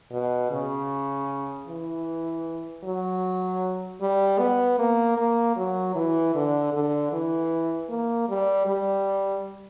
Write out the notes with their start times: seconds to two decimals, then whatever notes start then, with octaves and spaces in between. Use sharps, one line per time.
0.11 B2
0.51 C#3
1.67 E3
2.84 F#3
4.01 G3
4.39 B3
4.79 A#3
5.17 A#3
5.56 F#3
5.96 E3
6.35 D3
6.73 D3
7.13 E3
7.90 A#3
8.29 G3
8.67 G3